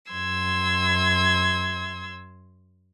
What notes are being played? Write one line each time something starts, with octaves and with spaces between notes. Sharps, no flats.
F#2 C6 E6 G#6